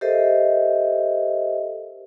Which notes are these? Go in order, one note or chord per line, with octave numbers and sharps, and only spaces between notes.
G4 A4 A#4 C5 D#5 E5